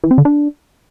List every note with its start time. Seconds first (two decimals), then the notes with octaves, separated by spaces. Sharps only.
0.04 E3
0.11 C4
0.18 D3
0.25 D4